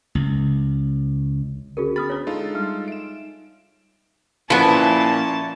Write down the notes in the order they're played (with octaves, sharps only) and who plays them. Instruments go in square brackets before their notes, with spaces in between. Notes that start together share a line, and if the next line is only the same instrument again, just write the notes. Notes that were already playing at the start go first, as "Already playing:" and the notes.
[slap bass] C#2
[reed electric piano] D3 C#4 [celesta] F#4 G#4 A#4
[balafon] B3 [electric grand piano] B5 [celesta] D#6 F6 A6
[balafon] D4 B4 [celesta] C#5
[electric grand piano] G#3 F4 A4 [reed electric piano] D#4
[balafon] G3
[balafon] E5 [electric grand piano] D7 E7
[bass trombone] A#2 [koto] F3 B3 [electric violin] C#4 A5 [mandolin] E4